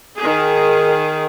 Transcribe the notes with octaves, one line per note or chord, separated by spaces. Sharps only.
D#3 G#4